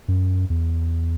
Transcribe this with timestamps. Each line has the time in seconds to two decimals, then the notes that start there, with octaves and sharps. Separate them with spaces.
0.08 F#2
0.50 E2